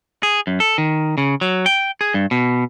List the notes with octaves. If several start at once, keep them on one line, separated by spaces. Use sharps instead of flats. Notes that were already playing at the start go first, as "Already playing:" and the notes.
G#4
F#2
A4
D#3
C#3
F#3
G5
G#4
G2
B2